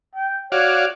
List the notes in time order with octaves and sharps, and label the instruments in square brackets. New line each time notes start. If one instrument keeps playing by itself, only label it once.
[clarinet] G5
[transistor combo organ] F#4 D5 F5 [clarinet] C#5